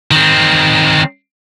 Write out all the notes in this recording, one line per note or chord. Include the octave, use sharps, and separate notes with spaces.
D#3 C4